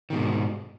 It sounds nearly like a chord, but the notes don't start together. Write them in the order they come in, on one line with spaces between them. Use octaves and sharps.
D#3 B2 G#2